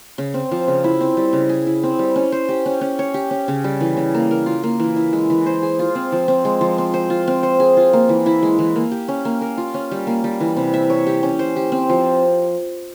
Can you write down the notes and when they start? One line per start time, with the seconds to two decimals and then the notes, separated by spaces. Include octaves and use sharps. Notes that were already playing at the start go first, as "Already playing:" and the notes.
0.18 C#3
0.34 C4
0.51 F3
0.68 C#3
0.84 E4
1.01 C4
1.17 G3
1.33 C#3
1.49 G#4
1.66 E4
1.83 C4
1.99 G3
2.16 C#4
2.32 C5
2.49 G4
2.66 C#4
2.81 C#4
2.99 C#5
3.14 G4
3.31 C#4
3.48 C#3
3.64 G3
3.81 E3
3.97 C#3
4.14 A#3
4.31 A#4
4.46 F4
4.63 A#3
4.80 E3
4.96 E4
5.13 G#3
5.30 E3
5.46 C5
5.63 G#4
5.79 F4
5.95 C4
6.12 F3
6.28 C4
6.45 G#3
6.61 F3
6.78 C4
6.94 C5
7.10 F4
7.28 C4
7.43 C5
7.60 G#4
7.77 F4
7.93 A#3
8.09 E3
8.26 E4
8.42 G#3
8.59 E3
8.75 A#3
8.91 G4
9.08 C#4
9.25 A#3
9.41 A#4
9.58 F4
9.74 C#4
9.91 G3
10.07 A#3
10.24 G3
10.40 E3
10.56 C3
10.74 E5
10.90 C#5
11.07 G4
11.23 C#4
11.39 C5
11.56 G4
11.72 C4
11.89 F3